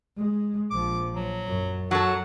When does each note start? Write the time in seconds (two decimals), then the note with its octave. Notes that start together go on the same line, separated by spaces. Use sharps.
0.17 G#3
0.71 A#1 F3 D6
1.15 F#3
1.46 F#2
1.91 F#3 A4 F#5